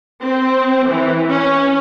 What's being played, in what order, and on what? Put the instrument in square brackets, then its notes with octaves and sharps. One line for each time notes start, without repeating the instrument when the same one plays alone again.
[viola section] C4
E3
C#4